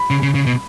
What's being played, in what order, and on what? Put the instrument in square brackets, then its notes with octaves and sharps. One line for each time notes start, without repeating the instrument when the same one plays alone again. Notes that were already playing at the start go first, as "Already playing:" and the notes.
Already playing: [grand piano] B5
[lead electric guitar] C#3
C#3
C#3
B2